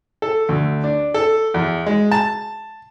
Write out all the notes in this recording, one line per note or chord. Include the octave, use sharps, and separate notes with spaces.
A4
D2
D4
A4
E2
G#3
A5